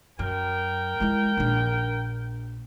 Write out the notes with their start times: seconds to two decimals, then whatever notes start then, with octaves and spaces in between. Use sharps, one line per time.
0.19 F#2 A#4 G5
1.00 G#3 E4
1.37 A#1 D4